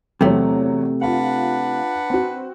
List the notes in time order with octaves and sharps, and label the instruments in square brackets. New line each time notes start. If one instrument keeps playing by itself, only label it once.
[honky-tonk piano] E2 F#3 [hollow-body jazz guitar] C3 A3
[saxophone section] D4 B4 F#5 [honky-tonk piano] F4 F5
[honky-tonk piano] C4 F#4